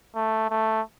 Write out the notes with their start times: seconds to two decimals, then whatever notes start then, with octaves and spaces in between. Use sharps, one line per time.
0.15 A3
0.50 A3